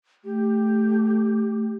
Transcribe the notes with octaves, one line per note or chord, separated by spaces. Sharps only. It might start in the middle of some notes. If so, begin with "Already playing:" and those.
A3 G4